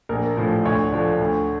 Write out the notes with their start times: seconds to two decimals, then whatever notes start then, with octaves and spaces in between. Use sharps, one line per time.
0.09 A#1 A#4
0.37 A2 F3
0.65 D2 C#5
0.92 D3 F3
1.21 D2